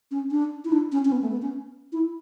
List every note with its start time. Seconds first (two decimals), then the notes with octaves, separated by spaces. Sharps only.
0.11 C#4
0.31 D4
0.65 E4
0.72 D4
0.92 C#4
1.05 C#4
1.12 B3
1.22 A3
1.32 B3
1.42 C#4
1.92 E4